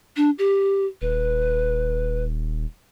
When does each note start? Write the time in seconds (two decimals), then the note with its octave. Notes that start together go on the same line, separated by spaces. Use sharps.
0.17 D4
0.39 G4
1.02 D#1 B4